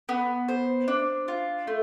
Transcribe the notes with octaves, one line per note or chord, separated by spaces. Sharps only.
B3
C5
D4
F4
A3